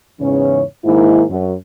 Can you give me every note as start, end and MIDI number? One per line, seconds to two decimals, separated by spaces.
0.20 0.63 40
0.20 0.63 44
0.20 0.63 49
0.20 0.63 52
0.20 0.63 61
0.20 0.63 73
0.85 1.24 44
0.85 1.24 51
0.85 1.24 58
0.85 1.24 64
1.30 1.53 42
1.30 1.53 54